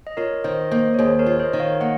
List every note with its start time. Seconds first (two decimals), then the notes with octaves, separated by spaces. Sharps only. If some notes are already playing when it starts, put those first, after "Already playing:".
0.07 D#5
0.17 F4 A#4 C#5
0.44 D#3 C5 D#5
0.72 A#3 C5 D#5
0.94 C#5
0.99 D#2 G#4 C5
1.19 A#4 C#5
1.26 F4
1.39 C5 D#5
1.53 D#3
1.60 C#5 F5
1.80 A#3 D#5 F#5